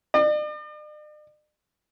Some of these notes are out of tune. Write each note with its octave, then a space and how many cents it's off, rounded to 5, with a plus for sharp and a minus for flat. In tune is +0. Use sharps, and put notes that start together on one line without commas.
D5 +45